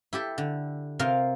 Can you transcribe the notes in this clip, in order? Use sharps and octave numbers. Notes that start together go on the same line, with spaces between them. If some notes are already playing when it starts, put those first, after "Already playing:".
E4 G4 A4
D3
C3 F4 A#4 F5